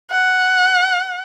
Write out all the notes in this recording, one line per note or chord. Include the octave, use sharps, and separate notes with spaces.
F#5